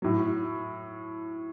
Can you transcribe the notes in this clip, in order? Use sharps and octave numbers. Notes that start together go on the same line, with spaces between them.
A2 F#3